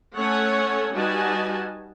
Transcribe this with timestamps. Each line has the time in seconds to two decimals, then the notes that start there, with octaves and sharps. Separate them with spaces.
0.14 A3 C#4 A4 C#5 F#5 G#5
0.93 G3 D#4 F#4 B4 G#5 A5